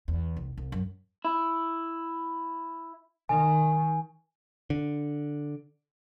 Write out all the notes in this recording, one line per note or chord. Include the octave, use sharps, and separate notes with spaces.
E2
C2
C2
F#2
E4
D#3 G#5
D3